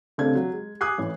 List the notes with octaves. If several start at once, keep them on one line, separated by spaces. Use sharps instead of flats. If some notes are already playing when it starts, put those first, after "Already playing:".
C#2 C3 A3 C4 D4 G#6
F#3
G#3
G#5 D6 D#6 F#6 G#6 C7
A1 E3